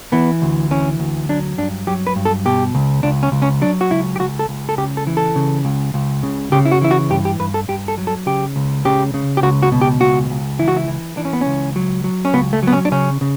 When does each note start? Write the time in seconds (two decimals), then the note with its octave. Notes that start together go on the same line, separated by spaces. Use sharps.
0.12 E3 B3
0.42 D2
0.71 E3 C#4
1.00 D2
1.29 F#3 D4
1.58 G2 D4
1.87 F#3 G4
2.07 B4
2.16 G2
2.25 A4
2.45 B2 G4
2.75 C#2
3.03 C#2 D4
3.23 C#4
3.32 C#2
3.42 C#4
3.61 F#3 D4
3.81 F#4
3.90 C#2 E4
4.16 G4
4.20 C#2 F#4
4.39 A4
4.49 C#2
4.69 A4
4.78 C#3 G4
4.97 A4
5.07 E3
5.17 A4
5.36 C#3
5.65 C#2
5.94 C#2
6.23 C#3
6.52 C#3 G4
6.65 E4
6.72 F#4
6.81 E3 E4
6.91 F#4
7.10 G2 G4
7.25 G4
7.40 G2 B4
7.54 A4
7.68 G2 G4
7.88 A4
7.98 F#3
8.07 A4
8.26 C#3 G4
8.56 C#2
8.85 C#3 G4
9.14 C#3
9.37 G4
9.43 C#2 F#4
9.63 F#4
9.72 B2
9.81 G4
10.01 C#2 F#4
10.30 C#2
10.59 E3 E4
10.68 F#4
10.77 E4
10.88 E3
11.17 E3 D4
11.25 C#4
11.33 B3
11.41 C#4
11.46 C#2
11.76 F#3
12.04 F#3
12.25 C#4
12.34 C#2 B3
12.53 A3
12.63 F#3 B3
12.73 C#4
12.85 D4
12.92 C#3 C#4
13.21 C#3